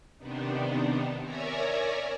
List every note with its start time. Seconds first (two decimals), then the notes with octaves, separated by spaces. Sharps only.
0.18 C3 D#3 B3 D4 D#4
1.22 A#4 C#5 D5 E5 G#5 A#5